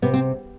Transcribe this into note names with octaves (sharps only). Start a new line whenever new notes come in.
C3 B3
C4